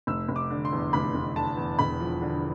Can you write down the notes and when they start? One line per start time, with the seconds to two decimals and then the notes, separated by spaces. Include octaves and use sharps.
0.07 F1 E6
0.29 F1
0.36 D6
0.50 D3
0.65 C6
0.72 E2
0.93 F1 B5
1.15 F1
1.36 D3 A5
1.57 E2
1.79 E1 B5
2.00 F3
2.22 D3